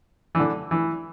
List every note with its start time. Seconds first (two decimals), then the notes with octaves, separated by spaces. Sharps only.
0.35 E3
0.40 D3
0.71 E3